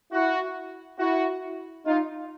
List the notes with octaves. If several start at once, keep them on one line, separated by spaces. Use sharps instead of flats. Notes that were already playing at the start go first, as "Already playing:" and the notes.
E4 F#4
E4 F#4
D#4 F4